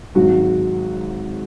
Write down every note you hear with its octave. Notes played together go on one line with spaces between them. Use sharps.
G#1 G#2 F#3 F#4